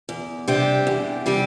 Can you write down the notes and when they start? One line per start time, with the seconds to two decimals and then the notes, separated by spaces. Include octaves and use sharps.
0.09 E2
0.48 C3 G3 D4 G4
0.87 E2
1.26 C3 G3 D4 G4